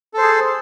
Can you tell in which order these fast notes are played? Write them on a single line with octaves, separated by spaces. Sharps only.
A4 C5 G#4